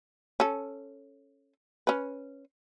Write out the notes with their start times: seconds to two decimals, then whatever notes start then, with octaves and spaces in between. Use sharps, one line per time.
0.40 C#4 A4
1.87 C#4 B4